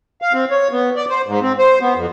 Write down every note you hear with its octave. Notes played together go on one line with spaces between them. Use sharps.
F5
C4
C#5
B3
D5
C5
G#2
C4
C5
B3
F2